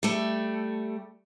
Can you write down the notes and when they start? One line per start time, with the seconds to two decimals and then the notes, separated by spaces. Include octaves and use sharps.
0.03 G3 A3